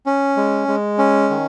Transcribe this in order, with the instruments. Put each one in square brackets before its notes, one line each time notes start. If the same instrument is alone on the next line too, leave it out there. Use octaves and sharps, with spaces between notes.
[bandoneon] C#4
G#3
G#3
C#4
D#3